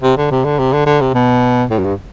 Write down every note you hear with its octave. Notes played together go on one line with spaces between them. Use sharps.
C3
D3
C3
D3
C3
D3
D3
C3
B2
A2
F#2
G2